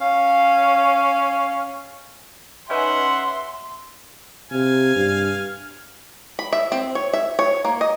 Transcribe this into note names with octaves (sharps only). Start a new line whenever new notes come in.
C#4 F5
C#4 D#4 B4 E5 F#5 C6
C3 F5 G#5
G2
B5
E5
C4
C#5
E5
C#5
A#3
D#5